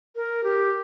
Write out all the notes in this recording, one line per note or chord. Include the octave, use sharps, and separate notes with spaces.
A#4
G4